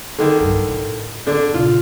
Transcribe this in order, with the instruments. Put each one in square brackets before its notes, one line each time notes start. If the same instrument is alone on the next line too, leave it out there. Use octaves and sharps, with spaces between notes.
[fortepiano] D3 D#3
[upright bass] G2 A3
A2
[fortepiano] D3 D4
[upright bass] A#2 C#3 [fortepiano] F4